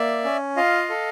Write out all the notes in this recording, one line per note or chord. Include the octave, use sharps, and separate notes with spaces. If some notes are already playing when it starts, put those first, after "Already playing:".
Already playing: A#3 D5 E5
C#4
F4 D#5 F5
A4